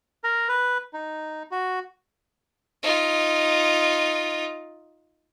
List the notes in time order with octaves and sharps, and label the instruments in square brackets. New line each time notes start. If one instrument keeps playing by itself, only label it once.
[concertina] A#4
B4
D#4
F#4
[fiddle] D#4 F4